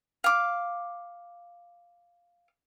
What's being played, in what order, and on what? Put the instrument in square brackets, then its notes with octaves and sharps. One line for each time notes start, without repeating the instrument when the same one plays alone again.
[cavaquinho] F5 D6